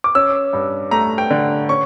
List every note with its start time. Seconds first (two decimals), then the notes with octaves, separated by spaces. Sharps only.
0.04 D6
0.15 C#4 E6
0.53 G2
0.91 A3 A#5
1.18 G5
1.30 D3
1.69 C#4 C#6